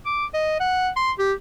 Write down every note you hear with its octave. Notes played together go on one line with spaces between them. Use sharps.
D6
D#5
F#5
C6
G4